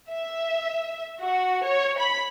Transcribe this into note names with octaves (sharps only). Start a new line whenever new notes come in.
E5
F#4
C#5
B5